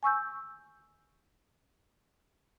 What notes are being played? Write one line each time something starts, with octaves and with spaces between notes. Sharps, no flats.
G#5 C#6 E6 G6